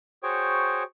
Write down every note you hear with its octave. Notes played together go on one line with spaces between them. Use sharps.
F#4 G#4 C5 C#5 G5 C#6